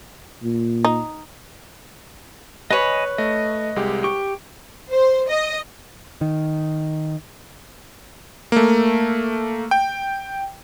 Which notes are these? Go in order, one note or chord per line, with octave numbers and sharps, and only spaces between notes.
A#2
D#4
B4 C#5 D#5 G#5 B5
A3 D#5
C2 G#3 G4
G4 C#6
C5
D#5
D#3
A3 A#3
G5